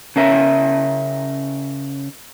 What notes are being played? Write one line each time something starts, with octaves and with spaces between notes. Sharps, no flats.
C#3 C#4 A#4 E5